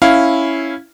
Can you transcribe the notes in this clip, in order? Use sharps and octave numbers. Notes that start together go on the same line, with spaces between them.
C#4 E4 F5